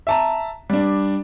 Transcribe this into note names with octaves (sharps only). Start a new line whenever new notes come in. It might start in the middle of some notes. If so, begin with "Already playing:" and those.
E5 A5 A#5
G3 D4